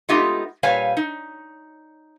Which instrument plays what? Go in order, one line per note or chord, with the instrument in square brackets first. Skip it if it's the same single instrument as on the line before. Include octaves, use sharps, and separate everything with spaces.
[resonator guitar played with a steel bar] G#3 A3 B3 D#4 F4 G4
A#2 G3 B4 C#5 F5 G#5
D#4